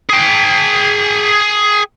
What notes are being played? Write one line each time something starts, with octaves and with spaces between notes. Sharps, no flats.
G#4 G5